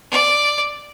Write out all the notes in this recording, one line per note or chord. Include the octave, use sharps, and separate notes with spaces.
D5